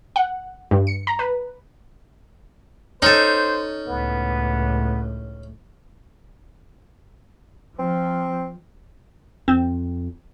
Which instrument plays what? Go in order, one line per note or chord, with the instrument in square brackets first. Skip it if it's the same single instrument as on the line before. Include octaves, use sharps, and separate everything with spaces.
[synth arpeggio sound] F#5
G2
C#7
A#5
B4
[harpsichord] C#4 [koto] D#4 A4 [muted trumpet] C5
[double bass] C#2 A2 [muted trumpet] B3
[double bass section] F3 [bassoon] C4
[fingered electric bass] F2 [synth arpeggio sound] C4